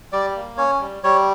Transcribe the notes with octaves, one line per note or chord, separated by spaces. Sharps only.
G3 D5
A#3
C#4 C#5
G3
G3 C#5